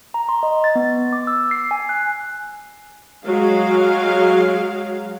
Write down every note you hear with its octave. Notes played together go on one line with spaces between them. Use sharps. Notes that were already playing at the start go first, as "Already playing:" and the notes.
A#5
C6
D#5
A6
B3
D6
E6
C7
G#5
F#6
F#3 G#3 F5